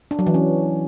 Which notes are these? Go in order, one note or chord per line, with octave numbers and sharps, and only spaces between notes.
D4
F#3
E3
C#4